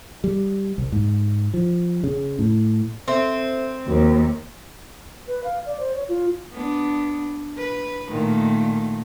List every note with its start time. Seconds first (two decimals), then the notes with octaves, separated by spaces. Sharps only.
0.24 G3
0.78 C2
0.92 G#2
1.54 F3
2.04 C#3
2.39 A2
3.08 C4 A4 C5 E5
3.87 D#2 F#4 A#4
5.27 B4
5.44 F5
5.66 D5
5.80 C5
5.95 C#5
6.09 F4
6.53 B3 D4
7.57 B4
8.09 A#2 D#3 A3